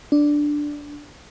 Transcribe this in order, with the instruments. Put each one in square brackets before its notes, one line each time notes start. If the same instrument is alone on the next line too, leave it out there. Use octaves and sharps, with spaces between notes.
[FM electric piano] D4